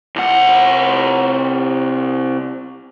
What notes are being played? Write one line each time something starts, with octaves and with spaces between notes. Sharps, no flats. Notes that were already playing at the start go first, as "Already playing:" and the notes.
C2 F#5